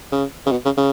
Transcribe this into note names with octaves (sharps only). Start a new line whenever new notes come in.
C#3
C#3
B2
C#3
C#3